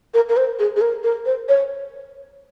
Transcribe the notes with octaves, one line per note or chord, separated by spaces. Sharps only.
A#4
A#4
C5
G#4
G#4
A#4
A#4
C5
C#5